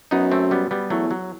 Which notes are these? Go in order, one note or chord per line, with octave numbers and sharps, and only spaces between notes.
F#2 B3 D#4
A3 C4
G3 B3
G3 B3
E2 F#3 A3
F#3